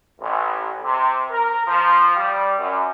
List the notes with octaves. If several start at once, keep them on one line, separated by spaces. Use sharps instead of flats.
A1
C3
A#4
F3
G3
F#2